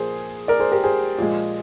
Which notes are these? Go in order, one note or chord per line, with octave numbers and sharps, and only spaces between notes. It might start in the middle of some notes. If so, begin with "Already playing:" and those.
Already playing: A#2 F3 A#3 G#4 C5
A#4 D5
G#4 C5
G4 A#4
G#4 C5
A#2 F3 G#3